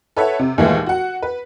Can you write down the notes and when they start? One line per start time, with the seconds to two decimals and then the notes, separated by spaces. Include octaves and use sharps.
0.17 A4 B4 C#5 E5 F#5
0.39 C3
0.58 D#2 A#2 E3 G#3 A3
0.86 F#4 F#5
1.22 B4